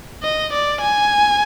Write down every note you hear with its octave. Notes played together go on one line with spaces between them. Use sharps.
D#5
D5
G#5